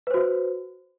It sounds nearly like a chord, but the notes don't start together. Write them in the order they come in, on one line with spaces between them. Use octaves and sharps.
B4 C5 F#4